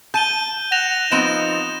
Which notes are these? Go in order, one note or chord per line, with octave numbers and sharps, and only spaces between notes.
A5 G6 D#7 G7
F#5 A#6 E7 F7
F3 B3 C4 D#4 E7